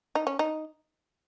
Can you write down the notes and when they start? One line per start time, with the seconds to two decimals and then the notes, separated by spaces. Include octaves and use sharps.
0.15 D#4
0.27 C#4
0.39 D#4